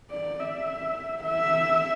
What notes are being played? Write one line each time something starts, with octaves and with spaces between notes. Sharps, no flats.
D5
E5
E5